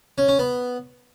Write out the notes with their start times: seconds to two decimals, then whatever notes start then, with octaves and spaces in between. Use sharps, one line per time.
0.18 C#4
0.28 C#4
0.39 B3